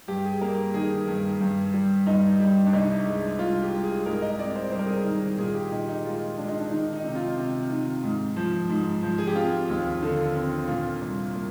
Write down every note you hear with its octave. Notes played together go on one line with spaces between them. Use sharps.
G2 G4
G#4
A#3 A#4
D#3 G#4
G2
G2
G3
G2 D#4
G3
D4
C2 D#4
G#3
C2 F4
G4
G#3
G#4
G#2 A#4
D#5
C4 D5
C5
G3 C5
A#4
G#4
A#4
D#3
A#2 G#4
G4
A#2 D#4
D#4
G#3 F4
G#3 D4
D#4
D4
D#3 D#4
D#4
C3
F4
C3
D#3
G#2
F3
G#2
F3
G#4
G4
C4 F4
D#2
D3
C4
A#2 F4
C2
A#3